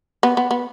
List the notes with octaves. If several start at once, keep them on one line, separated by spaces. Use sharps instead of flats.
B3
B3
B3